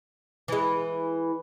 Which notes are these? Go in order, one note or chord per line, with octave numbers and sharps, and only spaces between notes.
E3 G#3